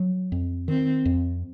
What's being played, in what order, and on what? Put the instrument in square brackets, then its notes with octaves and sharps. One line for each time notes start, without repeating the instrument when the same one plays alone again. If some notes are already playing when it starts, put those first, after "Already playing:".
Already playing: [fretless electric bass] F#3
F2
[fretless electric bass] D#3 [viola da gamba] C4
[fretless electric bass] F2